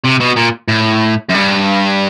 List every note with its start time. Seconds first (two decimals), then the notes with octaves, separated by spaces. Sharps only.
0.04 C3
0.20 B2
0.36 A#2
0.68 A2
1.29 F#2
1.34 G2